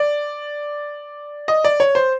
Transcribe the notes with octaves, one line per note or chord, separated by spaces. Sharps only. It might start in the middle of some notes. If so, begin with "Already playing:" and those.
Already playing: D5
D#5
D5
C#5
C5